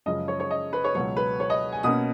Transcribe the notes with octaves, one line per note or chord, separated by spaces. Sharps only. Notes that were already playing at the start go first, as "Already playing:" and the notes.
F#2 C#3 F3 G#3 C#4 D#5
C#5
C#5
D#5
B4
C#5
C#2 B2 F#3 C#5
B4
C#5
D#5
G#5
B2 A#3 C#4 D#6